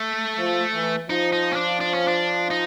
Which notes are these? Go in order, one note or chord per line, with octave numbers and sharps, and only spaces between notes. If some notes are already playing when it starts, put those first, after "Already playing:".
Already playing: A3
F3
E3
F3 D#4
D#4
C#4
D4
D4
C#4
D4
D#4